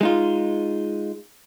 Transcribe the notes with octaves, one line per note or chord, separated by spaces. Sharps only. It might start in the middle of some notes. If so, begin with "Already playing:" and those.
G#3 D#4 F4